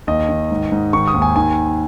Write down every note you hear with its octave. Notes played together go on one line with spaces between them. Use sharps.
D#2 D#5
D#3
G#2
G#2
D#3 C#6
D#6
D#2
G#5
D#3 G#5